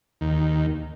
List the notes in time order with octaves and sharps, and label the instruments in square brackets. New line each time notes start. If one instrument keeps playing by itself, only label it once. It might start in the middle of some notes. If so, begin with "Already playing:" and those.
[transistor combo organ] D#2